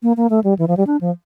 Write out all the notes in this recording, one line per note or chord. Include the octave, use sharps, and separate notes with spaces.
A#3
A#3
A3
G3
E3
F3
G3
D4
F3